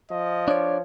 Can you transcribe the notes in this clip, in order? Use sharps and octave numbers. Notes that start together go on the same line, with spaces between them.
F3 D#5
D4 C#5 D5